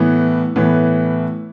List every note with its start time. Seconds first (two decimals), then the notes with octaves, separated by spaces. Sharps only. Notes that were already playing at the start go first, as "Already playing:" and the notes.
Already playing: A2 E3 B3
0.56 A2 E3 B3